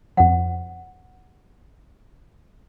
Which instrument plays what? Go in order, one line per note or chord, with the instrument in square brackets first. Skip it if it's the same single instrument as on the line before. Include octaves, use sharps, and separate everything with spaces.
[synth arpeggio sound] F2 F3 [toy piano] F#5